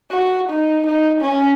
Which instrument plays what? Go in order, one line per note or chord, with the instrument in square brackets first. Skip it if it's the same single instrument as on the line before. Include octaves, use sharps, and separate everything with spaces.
[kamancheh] F#4
D#4
D#4
C#4